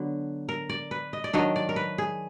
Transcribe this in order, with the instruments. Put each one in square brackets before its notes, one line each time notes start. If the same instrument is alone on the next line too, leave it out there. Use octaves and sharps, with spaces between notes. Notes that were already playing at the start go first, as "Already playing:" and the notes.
Already playing: [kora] D3 F#3 B3
A#4
D5
B4
D#5
D5
D#3 F#3 D4 D#5
D5
A#4
B4
G#4